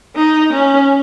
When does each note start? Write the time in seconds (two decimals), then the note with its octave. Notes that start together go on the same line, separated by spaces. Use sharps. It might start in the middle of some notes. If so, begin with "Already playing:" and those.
0.16 D#4
0.53 C#4